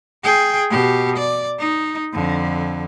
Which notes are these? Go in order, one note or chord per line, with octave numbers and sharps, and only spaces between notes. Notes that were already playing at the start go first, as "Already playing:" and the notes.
G#4 G5
B2 G4
D5
D#4
F2 D3